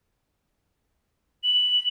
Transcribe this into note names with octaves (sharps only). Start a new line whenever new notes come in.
F#7